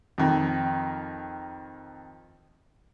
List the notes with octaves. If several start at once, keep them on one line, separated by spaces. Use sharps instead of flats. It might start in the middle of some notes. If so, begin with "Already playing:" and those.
F2 D#3